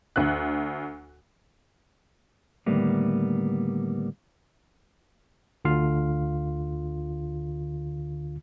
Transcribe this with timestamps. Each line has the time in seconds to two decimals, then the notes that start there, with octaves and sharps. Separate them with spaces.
0.16 D2 F#6
2.66 D2 A2 D#3 G3 A#3 B3
5.65 D2 D3 F4 F5